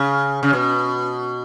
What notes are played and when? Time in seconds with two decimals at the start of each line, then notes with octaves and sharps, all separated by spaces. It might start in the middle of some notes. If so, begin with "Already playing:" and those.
Already playing: C#3
0.43 C#3
0.53 B2